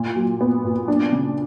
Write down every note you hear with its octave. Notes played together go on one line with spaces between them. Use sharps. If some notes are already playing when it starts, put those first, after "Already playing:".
Already playing: A#2
F#3
B3
A#2
D4
C#3